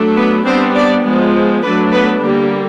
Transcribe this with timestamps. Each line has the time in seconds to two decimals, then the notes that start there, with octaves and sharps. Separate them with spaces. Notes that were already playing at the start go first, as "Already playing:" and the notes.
Already playing: F#3 A3 D4
0.16 B3 B4
0.46 G3 B3 C4 D4 C5
0.75 D4 D5
1.05 F3 G#3 B3
1.63 F#3 A3 B3 D4 B4
1.93 B3 B4
2.22 D3 G3 A#3